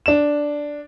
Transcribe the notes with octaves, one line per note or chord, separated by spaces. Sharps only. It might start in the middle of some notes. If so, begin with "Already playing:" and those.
D4 E7